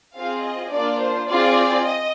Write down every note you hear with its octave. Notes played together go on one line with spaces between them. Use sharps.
C4 F4 G#4 F5
D#5
A#3 D4 F4 D5
C5
C4 F4 G#4 D5
D#5